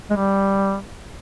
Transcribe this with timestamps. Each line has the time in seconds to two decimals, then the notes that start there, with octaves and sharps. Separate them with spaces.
0.10 G#3
0.16 G3